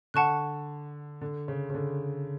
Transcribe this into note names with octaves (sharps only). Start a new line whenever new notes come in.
D3 F#5 A5 C#6 F#6
D3
C#3
C#3
D3